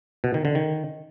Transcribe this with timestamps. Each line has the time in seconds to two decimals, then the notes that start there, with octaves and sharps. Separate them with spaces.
0.24 B2
0.34 D#3
0.45 D3
0.55 D#3